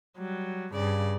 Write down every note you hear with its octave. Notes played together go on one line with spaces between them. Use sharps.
F#3 G3
G2 C#3 D5